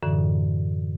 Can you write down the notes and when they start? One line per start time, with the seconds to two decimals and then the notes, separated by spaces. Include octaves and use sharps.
0.03 F#2 A2 D3 E3